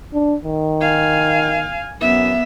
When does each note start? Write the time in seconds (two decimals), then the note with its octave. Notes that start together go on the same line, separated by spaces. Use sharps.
0.14 D4
0.45 D#3
0.81 F5 G#5
2.00 F#2 B3 E5